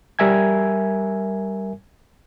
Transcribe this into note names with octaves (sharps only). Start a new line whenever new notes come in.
G3 A#4 E5 G#5 G#6